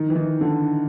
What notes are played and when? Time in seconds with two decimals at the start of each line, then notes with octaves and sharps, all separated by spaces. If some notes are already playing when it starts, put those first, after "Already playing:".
Already playing: D#3
0.10 E3
0.16 D#3
0.41 D3